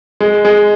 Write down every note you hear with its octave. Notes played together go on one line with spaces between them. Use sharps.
G#3
G#3